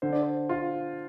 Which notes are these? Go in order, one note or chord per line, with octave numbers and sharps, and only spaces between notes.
D3 C5
D5
C5
F4